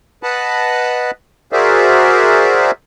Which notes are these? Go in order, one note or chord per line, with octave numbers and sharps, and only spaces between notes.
B4 D#5 F#5 A5 B5
F#4 G#4 A#4 C5 D5 E5